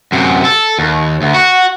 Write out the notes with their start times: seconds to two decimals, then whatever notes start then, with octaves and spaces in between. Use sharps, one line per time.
0.12 F#2 C3
0.45 A4
0.79 D#2
1.22 D2
1.34 F#4